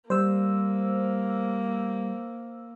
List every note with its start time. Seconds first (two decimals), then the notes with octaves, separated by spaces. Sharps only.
0.10 G3 A#3 C5 E6